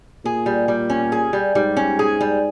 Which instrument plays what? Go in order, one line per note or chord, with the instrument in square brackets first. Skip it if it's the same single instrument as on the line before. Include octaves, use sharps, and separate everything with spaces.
[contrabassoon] A#2 [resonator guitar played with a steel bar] G#4
[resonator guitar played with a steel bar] G3
G3
C#4
G#4
G3
[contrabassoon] G#2 [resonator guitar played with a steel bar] G3
[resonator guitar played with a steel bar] C#4
G#4
G3